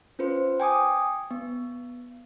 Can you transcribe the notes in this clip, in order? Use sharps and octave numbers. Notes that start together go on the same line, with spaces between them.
C#4 F4 B4 C5
G5 G#5 D6 D#6
B3